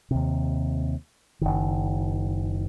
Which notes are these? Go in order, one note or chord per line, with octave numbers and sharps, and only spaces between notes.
D#2 C3
F#1 C2 D#3